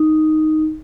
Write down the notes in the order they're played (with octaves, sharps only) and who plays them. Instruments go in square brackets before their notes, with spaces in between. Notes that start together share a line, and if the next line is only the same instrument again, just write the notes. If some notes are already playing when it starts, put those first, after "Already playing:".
Already playing: [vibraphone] D#4